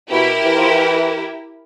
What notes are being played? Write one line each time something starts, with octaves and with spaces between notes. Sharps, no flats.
B2 E4 G4 A#4
E3
F3
E3